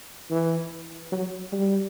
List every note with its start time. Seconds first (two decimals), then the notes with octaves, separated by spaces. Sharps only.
0.30 E3
1.12 F#3
1.52 G3